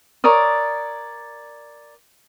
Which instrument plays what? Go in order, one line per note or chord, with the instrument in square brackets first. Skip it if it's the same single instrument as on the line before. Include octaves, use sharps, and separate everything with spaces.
[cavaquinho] A#4 C#5 D5 D#6